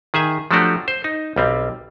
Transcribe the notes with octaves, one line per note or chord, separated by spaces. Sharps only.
D#3 G#4 E5 G#5
F3 F#3 A3 D4 F#4 G4
C5
D#4
B1 G3 C4